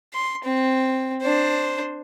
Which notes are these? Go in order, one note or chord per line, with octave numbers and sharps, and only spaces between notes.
C6
C4
D4 C5